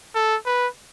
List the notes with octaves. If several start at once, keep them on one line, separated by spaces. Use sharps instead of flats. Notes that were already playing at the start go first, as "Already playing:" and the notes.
A4
B4